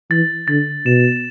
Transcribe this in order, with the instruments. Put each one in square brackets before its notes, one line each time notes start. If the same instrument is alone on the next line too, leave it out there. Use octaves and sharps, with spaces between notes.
[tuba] E3 [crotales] A6
[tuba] D3 [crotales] A6
[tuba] B2 [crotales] E7